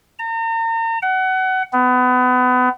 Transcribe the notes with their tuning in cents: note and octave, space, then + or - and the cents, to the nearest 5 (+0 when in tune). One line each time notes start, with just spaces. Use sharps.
A#5 -40
F#5 +25
B3 +30